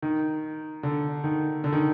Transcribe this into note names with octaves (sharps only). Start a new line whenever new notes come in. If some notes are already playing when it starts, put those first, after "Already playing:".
D#3
D3
D#3
D3
D#3